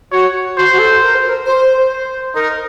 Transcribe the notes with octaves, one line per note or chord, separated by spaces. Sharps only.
F#4 C#5
F#4 C5
F#4
A4
A#4
C5
A#4
C5
C5
D#4 A#4